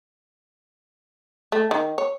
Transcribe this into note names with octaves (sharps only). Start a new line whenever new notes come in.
A3
D#3
C#5